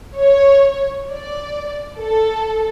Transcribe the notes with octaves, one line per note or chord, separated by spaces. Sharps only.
C#5
D5
A4